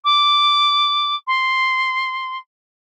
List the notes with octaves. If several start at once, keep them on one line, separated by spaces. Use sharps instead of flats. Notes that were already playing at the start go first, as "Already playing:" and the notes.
D6
C6